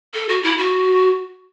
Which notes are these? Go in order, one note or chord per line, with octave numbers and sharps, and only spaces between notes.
A4
F#4
E4
F#4